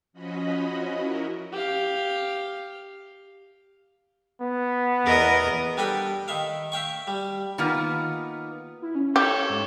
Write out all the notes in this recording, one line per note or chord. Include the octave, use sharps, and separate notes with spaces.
F3 C#4 F#4 D#5 B5
E4 F#4 A#4
G4 F5
B3
E2 A#4 D#5
G3 D4 A4 B4 G5
D#3 E5 F5
E5 F5 G5 C#6
G3
D#3 A#3 B3 F4
E4
C#4
G4 A4 C#5
G#2